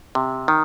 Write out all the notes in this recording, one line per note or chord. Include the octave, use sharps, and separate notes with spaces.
C3
D#3